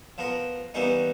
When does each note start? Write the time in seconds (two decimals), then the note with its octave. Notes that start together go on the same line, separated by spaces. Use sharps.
0.18 F3 B3 A#4
0.74 E3 G3 A#3 B3 C#4 D#4